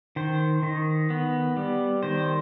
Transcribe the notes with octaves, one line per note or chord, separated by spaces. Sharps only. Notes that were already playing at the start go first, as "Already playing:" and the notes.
D#3 C5
D#3
B3
G3
D#3 C5